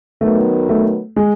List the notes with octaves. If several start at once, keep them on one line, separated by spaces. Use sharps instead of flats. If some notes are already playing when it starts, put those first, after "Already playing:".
D#3 F#3 A3 B3
A3
G#3